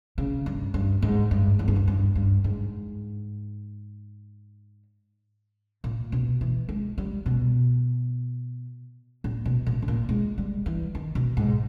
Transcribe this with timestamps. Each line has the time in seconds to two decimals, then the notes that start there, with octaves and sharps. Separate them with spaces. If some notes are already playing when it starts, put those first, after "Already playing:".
0.18 C#3
0.46 G2
0.74 G2
1.02 G#2
1.31 G2
1.59 E2
1.68 G2
1.76 E2
1.87 G2
2.15 G2
2.44 G#2
5.84 A#2
6.12 B2
6.41 E3
6.69 G#3
6.98 G3
7.26 B2
9.24 A#2
9.45 B2
9.67 A#2
9.82 B2
9.88 A#2
10.09 G#3
10.38 G3
10.66 E3
10.95 D#3
11.15 B2
11.37 G#2